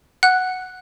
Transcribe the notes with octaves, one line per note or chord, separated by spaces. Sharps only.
F#5 F#6